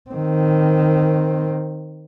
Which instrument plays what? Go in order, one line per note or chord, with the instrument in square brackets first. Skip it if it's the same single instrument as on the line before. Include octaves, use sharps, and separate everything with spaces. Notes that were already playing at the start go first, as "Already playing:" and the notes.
[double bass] D#3 C4